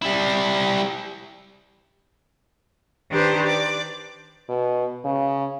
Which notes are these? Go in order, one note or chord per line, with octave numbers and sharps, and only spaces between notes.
G3 E4
D#3 D4 G4 B4 C5
D5
B2
C#3